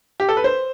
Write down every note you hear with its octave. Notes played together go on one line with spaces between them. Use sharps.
G4
A4
B4
C5